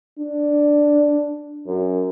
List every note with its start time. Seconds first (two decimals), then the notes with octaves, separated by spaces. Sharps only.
0.20 D4
1.67 F#2